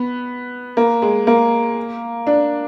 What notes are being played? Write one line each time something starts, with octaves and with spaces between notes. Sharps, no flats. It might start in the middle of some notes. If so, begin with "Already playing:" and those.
Already playing: B3
A#3
G#3
A#3
D4